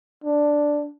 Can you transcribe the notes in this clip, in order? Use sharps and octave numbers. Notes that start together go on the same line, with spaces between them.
D4